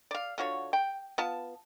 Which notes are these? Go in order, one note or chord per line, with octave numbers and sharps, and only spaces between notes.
D5 F5
D3 F4 F#4 C#5
G5
B3 F4 A5